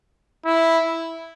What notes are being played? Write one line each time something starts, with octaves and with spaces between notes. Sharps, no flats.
E4